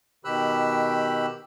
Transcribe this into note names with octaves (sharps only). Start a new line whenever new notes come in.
B2 D#3 G4 B5 E6 F#6